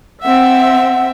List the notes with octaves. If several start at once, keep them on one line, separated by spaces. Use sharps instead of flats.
C4 E5 F#5